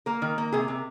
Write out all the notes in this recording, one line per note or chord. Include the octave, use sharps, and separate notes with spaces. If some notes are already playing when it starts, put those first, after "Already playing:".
A#3 A#4
D#3
A#3
C3 G#4
C3